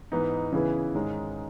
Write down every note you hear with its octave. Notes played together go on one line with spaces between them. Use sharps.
G#2 E3 B3 D#4
C#3 E3 B3 E4 G#4
G#2 D#3 G#3 C#4